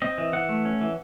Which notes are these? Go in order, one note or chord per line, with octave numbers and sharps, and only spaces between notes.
C4 D#5
E3
E3 F#5
A3
C#4
E3